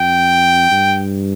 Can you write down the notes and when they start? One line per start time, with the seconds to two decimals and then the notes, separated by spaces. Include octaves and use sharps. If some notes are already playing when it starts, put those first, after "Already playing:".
Already playing: F2 G5
0.71 G2